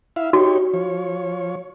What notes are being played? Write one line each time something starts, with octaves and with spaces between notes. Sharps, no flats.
E4 E5 F5
D#4 F#4 G4 C#5
F3 C#5